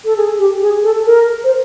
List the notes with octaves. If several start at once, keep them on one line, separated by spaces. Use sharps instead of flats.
A4
G#4
G4
G#4
A4
A4
A#4
C5